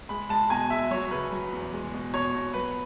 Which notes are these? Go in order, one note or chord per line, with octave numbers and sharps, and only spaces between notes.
G#3 B5
G#3 A5
B2 G#5
G#3 E5
F#3 C#5
C#3 B4
F#3
E2
G#3
B2
B2 C#5
B2
F#3 B4